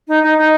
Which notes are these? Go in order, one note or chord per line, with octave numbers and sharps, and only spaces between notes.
D#4
D#4
D#4